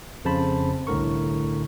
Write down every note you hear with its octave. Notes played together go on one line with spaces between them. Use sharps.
F2 C#3 C5 A5 B5
C2 A2 D3 A#4 C#6